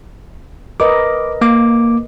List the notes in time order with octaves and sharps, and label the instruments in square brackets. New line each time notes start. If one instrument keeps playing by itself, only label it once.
[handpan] A#4 B4 D#5 [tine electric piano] D6
[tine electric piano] A#3 D6